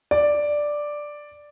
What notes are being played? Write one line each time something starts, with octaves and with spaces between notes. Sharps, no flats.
D5